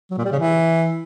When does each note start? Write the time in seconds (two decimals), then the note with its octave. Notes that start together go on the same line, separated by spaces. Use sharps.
0.11 F#3
0.18 A#2
0.25 G3
0.32 C#3
0.39 E3